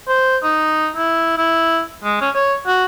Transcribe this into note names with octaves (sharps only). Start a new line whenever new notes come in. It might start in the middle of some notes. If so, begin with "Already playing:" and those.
C5
D#4
E4
E4
G#3
C#4
C#5
F#4